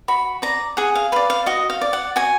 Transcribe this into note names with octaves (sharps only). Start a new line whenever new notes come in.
F#4 B5
D5 A#5
G#4 F#5
F5
B4 D5 F5
F5
F#4 D#5
F5
D5
F#5
F#4 G#5